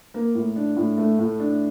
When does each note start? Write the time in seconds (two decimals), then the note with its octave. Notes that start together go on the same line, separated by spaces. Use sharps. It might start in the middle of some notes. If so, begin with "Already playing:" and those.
0.14 A#3
0.35 A2
0.56 D4
0.77 A2
0.97 A3
1.19 A2
1.40 D4